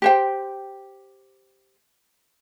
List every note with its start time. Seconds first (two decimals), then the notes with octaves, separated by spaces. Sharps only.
0.02 G4 C5 G5